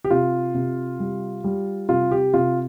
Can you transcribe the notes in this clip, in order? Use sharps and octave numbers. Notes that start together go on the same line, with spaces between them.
G4
C3 F4
C3
G3
G3
C3 F4
G4
C3 F4